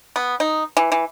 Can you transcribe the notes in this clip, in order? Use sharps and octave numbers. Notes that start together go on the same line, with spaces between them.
B3
D#4
E3
E3